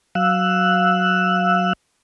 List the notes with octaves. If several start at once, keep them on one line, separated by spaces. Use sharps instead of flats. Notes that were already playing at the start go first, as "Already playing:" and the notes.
F#3 F5 E6 F#6